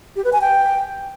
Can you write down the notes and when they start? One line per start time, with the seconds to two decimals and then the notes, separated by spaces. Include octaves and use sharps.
0.16 G4
0.24 B4
0.33 G#5
0.41 G5